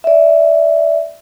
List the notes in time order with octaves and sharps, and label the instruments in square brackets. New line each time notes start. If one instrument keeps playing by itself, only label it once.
[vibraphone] D5 E5